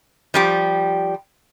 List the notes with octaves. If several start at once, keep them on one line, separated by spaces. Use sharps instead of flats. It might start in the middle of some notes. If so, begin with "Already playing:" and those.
F3 G3 G4